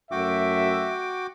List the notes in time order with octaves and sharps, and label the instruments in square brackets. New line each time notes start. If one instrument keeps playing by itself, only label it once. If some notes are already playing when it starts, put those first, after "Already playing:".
[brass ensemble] F#2 A3 E5 [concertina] F#4 G5 D6